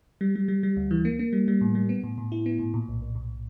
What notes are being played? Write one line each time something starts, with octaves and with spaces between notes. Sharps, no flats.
G3
G3
G3
G3
D2
E3
A#3
A#3
G3
G3
A2
G3
B3
A2
A2
E4
B3
A2
A#2
B1
B1
A#2